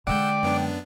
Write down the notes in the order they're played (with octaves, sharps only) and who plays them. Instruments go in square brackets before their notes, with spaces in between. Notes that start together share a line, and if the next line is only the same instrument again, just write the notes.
[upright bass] D3 G#3 [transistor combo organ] D5 [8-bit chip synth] F#5 E6 G6 [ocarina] G5
[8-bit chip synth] F#2 B3 D4